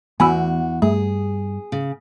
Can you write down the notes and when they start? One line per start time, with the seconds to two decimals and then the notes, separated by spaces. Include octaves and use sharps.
0.20 E2 E3 A3 B3 F#4 G#5 B5 E6
0.82 G2 A3 G#4
1.72 C#3